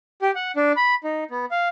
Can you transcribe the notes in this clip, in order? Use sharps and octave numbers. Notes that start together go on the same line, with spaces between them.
G4
F#5
D4
B5
D#4
B3
F5